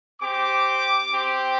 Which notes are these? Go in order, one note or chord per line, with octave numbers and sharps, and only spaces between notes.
C4 G4 D6
C4 G4